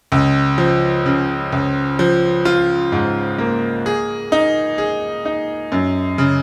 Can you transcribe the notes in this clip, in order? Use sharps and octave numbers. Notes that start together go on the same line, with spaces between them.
C#2
F3
C#3
C#2
F3
F4
G#2
A#3
G#4
D#4
G#4
D#4
F#2
C#3